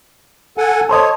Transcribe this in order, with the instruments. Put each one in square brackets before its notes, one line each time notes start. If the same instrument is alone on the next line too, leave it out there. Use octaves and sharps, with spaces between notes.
[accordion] A4 F#5 G#5
[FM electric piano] A4 C5 D#5 [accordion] C#5